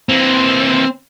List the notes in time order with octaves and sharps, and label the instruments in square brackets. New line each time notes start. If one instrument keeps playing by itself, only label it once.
[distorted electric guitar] E3 A#3 [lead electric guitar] C4